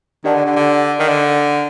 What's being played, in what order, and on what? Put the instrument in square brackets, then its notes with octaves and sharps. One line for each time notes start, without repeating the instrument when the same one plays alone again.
[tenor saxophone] D#3 [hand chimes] D4 G4 D5 F#5 A5
[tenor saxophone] D3
D3
D3
D#3
D3